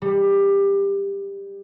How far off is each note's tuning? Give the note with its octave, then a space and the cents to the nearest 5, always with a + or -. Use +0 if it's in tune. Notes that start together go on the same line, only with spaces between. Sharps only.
G3 +20